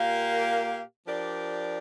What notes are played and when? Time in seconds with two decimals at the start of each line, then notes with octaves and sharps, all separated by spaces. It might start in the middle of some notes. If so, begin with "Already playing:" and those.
Already playing: A#2 A#3 G4 A#4 F5
1.06 F3 D4 G4 A#4 D5